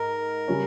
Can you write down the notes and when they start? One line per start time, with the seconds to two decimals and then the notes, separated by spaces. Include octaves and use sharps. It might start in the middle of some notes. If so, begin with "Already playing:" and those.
Already playing: G#2 A#4
0.48 C#3 G3 C#4